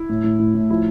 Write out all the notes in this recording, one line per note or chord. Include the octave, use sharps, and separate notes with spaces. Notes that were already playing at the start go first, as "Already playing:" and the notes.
Already playing: E4
A2
A2
A2
A2
F3 E4